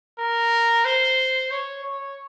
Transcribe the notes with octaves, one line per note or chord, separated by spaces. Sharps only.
A#4
C5
C#5
C#5